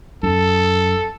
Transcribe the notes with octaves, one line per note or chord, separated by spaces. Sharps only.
F#2 A4